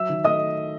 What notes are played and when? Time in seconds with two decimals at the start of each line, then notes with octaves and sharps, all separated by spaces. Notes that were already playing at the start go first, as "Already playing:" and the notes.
Already playing: F#3 E5 E6
0.09 D#3
0.24 A3 D#5 D#6